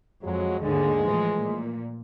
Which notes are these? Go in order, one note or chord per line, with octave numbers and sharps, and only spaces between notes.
F2 F#3 G#3
D#2 G#2 D3 G#3
A2 E3 F3
A#2